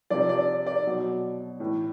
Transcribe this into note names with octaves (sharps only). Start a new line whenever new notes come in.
C3 F3 D5
D5
D5
B2 F#3
A2 E3